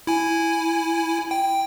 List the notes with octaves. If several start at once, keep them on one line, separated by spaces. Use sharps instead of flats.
E4 G#5
G5